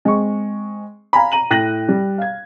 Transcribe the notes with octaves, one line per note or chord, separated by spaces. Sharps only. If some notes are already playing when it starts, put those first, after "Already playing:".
G#3 C4 C#6
F5 G#5 A#5 B5
A#5 D#7 F#7
A2 G5 F#6 A#6 D#7 F#7
G3
F5 G#6